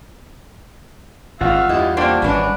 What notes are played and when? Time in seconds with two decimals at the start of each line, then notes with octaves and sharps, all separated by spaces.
1.41 G#1 F4 F5 F#5 E6
1.69 E2 G2 E4 G4 D#5
1.97 A3 A#3 D4 G4 C5 G5
2.22 G#1 G2 E3 G3 B3 C#4 D4 B5